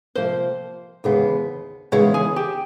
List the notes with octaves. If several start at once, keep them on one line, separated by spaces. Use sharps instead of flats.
C3 F3 A#3 C5
D#2 C#3 E3 G#3 B3
D#2 C#3 E3 G#3 B3 C#5
G#4
G4